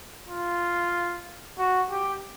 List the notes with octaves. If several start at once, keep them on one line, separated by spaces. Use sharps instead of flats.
F4
F#4
G4